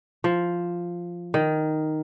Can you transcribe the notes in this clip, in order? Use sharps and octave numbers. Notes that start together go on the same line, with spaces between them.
F3
D#3